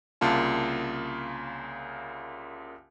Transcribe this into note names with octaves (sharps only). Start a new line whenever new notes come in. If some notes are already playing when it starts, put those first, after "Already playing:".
C2 C#3 A#3 F4 A5